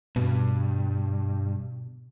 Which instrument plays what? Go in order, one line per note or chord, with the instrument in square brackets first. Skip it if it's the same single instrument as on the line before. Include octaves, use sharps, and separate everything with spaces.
[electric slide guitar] G2 [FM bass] B2